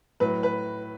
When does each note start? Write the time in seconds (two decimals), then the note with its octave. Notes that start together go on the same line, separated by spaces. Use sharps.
0.20 A2 F#3 B4
0.43 B4